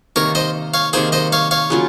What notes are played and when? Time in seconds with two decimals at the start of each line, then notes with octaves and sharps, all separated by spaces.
0.16 C3 D#3 A#3 A#4 C#5
0.35 C5 D#5
0.74 C#5 F5
0.93 C3 D#3 A#3 G#4 C5
1.12 C5 D#5
1.32 C#5 F5
1.51 C#5 F5
1.70 C#3 F#3 A#3 F4